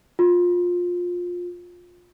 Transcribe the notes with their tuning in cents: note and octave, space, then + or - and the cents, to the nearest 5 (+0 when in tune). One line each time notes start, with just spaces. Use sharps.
F4 +20